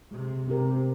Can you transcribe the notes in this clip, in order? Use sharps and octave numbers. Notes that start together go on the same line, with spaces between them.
C3 G#3
C3 C4 G4 A#4